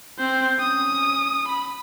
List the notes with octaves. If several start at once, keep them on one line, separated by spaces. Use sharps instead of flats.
C4 C5
C#4 D#6
B5